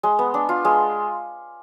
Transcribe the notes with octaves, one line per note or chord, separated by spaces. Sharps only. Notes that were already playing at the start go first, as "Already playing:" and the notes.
G#3
B3
D4
F4
G#3